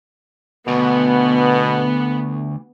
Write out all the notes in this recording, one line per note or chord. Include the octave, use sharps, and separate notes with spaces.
D2 B2 B3